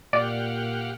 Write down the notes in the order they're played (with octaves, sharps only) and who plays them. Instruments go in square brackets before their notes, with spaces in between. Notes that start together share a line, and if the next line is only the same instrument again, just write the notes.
[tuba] A#2 [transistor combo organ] G4 F5 F#5 [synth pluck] D5